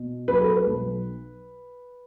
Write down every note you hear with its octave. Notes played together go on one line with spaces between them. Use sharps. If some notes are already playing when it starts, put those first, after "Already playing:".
Already playing: B2
F#3 B4
A4
B4
B1